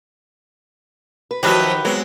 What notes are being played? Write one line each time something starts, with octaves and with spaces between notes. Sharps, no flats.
B4
D#3 F3 F#3 F#4 G4 B4 E5 B5
F#3 G#3 B3 C4